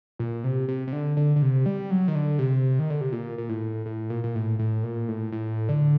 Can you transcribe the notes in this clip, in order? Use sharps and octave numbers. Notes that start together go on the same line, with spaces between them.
A#2
C3
C3
C3
D3
D3
D3
C3
G3
F#3
D#3
D3
C3
D#3
D3
C3
A#2
A#2
A2
A2
A#2
A#2
A2
A2
A#2
A2
A2
D3